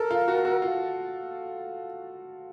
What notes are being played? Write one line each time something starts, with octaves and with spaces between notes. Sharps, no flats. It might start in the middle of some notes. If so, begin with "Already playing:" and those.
Already playing: A4 A#4
F4
F#4
F#4
F4